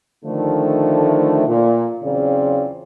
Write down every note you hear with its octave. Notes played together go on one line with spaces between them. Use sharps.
D3 D#3 F3 A3
A#2
E2 C#3 F#3 C4 F4 D5